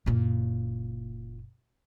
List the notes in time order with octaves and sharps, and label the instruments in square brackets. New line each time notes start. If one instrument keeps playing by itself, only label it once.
[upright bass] F#1 A#2